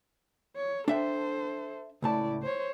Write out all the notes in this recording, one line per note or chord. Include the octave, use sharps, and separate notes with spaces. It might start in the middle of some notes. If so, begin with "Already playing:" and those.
C#5
D4 A4 C5 E5 G5
C#2 A2 E4 D5 A5
C5 C#5